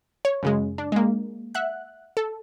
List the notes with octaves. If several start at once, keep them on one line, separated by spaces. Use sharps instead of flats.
C#5
F#2 C#3 G#3
D4
G#3 A#3
E5 F#5 F#6
A4